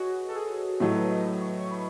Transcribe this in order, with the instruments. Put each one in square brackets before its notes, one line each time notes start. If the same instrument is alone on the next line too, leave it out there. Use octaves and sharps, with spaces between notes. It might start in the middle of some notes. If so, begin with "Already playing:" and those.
Already playing: [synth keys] F#4 G#4 B4 C#5 D#5
A4
G#4
[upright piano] A2 F#3 A3 [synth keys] D#5
[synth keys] B4
C#5
D#5
C#6
C#6
B5